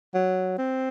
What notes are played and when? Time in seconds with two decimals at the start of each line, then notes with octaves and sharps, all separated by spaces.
0.14 F#3
0.58 C4